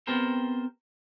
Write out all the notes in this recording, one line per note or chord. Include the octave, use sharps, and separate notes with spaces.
B3 C4 G4 A#4 C5